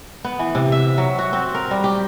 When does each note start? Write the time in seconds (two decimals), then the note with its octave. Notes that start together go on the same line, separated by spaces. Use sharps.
0.24 B3
0.39 E3
0.55 C3
0.72 E5
0.98 F#3
1.19 F#4
1.33 C4
1.55 A#4
1.71 G3
1.84 G4